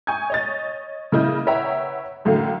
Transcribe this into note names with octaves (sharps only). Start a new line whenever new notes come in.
G#5 C#6 D#6 G6 G#6
C#5 D#5 A6
C#3 A#3 E4 D#5 G6
B4 C#5 E5 F#5 G5 A#5
F#2 A2 D3 F#3 F5